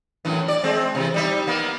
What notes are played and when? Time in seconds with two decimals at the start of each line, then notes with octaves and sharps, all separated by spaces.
0.25 F#2 A2 E3
0.48 D5
0.63 G#3 C4
0.95 C3 E3
1.14 G3 D#4 E5
1.47 A#3 B3